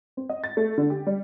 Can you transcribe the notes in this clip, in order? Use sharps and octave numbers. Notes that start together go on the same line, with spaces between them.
C4
D#5
A6
A3
D3
G4
G3